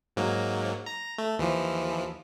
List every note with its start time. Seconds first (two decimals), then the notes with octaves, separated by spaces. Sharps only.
0.16 G#2 F#3 A#3
0.86 A#5
1.18 A3
1.38 D#2 E3 F3